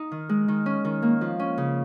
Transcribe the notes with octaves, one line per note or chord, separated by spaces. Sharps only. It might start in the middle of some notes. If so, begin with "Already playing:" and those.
Already playing: D#4
D#3
G#3
D#3
C#4
D#3
A#3
F3
C#4
C#3